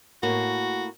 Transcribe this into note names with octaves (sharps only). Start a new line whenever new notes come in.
A2 A#3 F#4